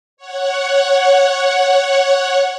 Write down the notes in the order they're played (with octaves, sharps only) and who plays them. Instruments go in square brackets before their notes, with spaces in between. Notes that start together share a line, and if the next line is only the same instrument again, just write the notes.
[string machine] C#5 F#5